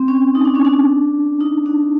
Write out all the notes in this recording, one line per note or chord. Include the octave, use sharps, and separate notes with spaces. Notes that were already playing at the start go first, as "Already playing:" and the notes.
Already playing: C4
C#4
D#4
D4
C#4
D4
D#4
D4